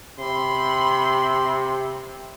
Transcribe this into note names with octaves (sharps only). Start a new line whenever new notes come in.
C3 B5 C6